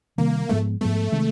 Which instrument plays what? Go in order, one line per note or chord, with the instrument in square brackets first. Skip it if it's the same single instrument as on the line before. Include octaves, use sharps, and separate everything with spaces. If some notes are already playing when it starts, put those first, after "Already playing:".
[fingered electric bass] C3 D#3 G3 [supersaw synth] A#3
[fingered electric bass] G#2 F3 G#3 B3 [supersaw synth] A3
[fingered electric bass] G#2 F3 G#3 B3 [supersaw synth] A3
[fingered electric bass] C3 D#3 G#3